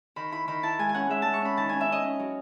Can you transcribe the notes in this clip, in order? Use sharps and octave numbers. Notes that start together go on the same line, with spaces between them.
D#3 B5
E4 B5
D#3 B5
E4 A5
G#3 G#5
G#5
C#4 F#5
G#3 E5
G#3 A5
C#6
C#4 B5
D#3 A5
C#4 G#5
E5
C#4 D#5
C#4
F#3